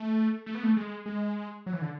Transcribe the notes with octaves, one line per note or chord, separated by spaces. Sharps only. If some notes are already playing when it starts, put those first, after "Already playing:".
Already playing: A3
A3
B3
A3
G#3
G#3
F#3
E3
D3